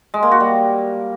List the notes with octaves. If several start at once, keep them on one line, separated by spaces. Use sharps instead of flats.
G#3
A#3
F#4
G3